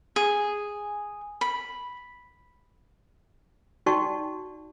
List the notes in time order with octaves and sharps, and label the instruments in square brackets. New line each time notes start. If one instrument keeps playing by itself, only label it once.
[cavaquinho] G#4
B5
[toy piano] D#4 F#4 D5 G5 A5 C#6